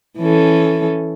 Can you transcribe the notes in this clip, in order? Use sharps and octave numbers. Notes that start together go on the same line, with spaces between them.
E3 C#4 A4